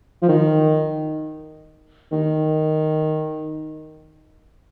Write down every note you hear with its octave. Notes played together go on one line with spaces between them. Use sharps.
F3
D#3
D#3